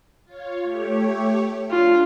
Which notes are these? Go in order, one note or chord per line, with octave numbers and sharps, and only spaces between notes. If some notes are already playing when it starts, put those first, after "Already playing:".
F4 C#5
A3 G4 C#5
D4 F4